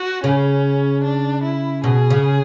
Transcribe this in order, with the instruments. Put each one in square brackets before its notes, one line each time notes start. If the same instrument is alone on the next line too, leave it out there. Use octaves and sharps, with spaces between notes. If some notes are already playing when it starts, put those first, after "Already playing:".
Already playing: [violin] F#4
[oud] C#3 [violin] C#4
[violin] D4
E4
[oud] B2 [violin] G#4
[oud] C#3